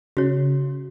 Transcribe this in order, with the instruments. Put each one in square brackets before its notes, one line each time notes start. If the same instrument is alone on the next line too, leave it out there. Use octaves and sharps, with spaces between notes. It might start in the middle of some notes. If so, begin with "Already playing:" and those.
[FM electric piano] C#3 [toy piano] F#4 C#5